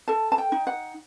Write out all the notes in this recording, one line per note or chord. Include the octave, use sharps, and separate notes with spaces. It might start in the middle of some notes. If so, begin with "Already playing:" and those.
A4 A5
A5
G5
D#4
F#5